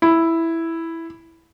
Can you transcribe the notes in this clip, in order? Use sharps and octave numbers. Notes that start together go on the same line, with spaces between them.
E4